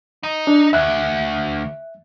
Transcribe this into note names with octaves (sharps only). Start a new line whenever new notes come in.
D#4
D4
D2 E5 F#6